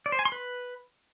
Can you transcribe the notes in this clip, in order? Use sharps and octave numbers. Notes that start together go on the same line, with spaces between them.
D5
C5
G#5
C6
B4